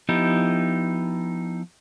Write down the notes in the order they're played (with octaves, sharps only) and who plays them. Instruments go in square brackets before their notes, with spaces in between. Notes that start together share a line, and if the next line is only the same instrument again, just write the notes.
[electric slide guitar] F3 B3 D#4 E4 G4